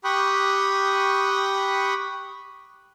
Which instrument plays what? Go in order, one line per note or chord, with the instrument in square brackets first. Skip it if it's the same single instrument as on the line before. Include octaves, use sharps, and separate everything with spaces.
[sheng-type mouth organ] G4 G5 B5 C#6 D#6 F#6